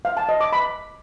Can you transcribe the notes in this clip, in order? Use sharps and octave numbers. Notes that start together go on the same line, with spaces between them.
F5
A5
D#5
D6
B5